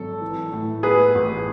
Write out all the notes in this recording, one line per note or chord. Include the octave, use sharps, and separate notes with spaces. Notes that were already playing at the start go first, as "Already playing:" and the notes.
Already playing: G#1 F#3 A4
E3
A2
B3 G#4 B4
A1